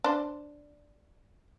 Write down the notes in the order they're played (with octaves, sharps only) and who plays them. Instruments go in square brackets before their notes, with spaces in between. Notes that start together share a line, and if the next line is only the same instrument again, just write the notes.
[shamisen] D4 C5